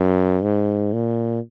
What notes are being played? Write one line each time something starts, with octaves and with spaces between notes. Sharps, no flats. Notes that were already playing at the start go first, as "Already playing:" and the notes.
Already playing: F#2
G#2
A#2